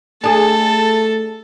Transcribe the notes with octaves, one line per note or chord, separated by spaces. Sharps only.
A3 D4 G#4 A4 A5